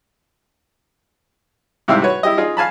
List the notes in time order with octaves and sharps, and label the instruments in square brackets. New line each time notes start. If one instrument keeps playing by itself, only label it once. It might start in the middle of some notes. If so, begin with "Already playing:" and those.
[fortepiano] G#2 C3 E4 G4 F5 E6
F#4 B4 C#5
E4 G4 D#5
D#4 F4 G#4 F5
F5 G#5 A5 B5